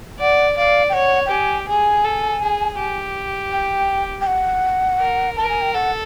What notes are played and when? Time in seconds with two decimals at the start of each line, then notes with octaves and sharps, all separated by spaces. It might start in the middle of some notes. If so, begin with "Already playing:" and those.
0.19 D5 F#5
0.57 D5 F5
0.89 G5
0.94 C#5 F#5
1.26 G5
1.31 G4 G#5
1.68 G#4 G#5
2.04 A4
2.42 G#4
2.79 G4
3.52 G5
4.21 G5
4.27 F#5
5.00 A#4
5.37 A#4 A5
5.49 G#5
5.61 G5
5.74 A4 F#5